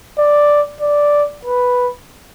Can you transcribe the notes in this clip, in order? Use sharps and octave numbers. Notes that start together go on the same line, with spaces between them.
D5
D5
B4